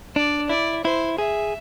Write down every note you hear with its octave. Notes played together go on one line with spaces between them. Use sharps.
D4 D5
E4 D5
E4 C5
G#4 E5